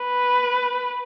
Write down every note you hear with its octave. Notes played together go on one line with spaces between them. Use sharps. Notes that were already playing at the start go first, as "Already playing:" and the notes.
Already playing: B4